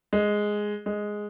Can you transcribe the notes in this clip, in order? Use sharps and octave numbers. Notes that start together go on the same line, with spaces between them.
G#3
G#3